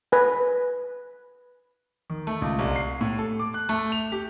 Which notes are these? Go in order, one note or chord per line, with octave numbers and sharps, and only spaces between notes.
B4 G#5
D#3
A3
C#2
C2
C7
A2
A4
D6
F#6
A3
F7
G4